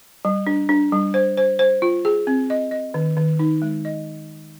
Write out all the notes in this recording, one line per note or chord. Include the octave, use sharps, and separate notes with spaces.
G3
D4
D4
G3
C5
C5
C5
F4
G#4
C4
D#5
D#5
D#3
D#3
D#4
G#3
D#5